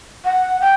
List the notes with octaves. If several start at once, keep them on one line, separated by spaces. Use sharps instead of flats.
F#5
G5